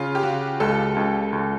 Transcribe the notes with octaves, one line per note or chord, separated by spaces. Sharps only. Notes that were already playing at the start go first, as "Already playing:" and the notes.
Already playing: C#3 F4
G4
C#3 F#4
C#2 A4
C#2
C#2